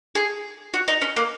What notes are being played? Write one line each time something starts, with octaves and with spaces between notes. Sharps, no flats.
G#4
F#4
D#4
C#4
A#3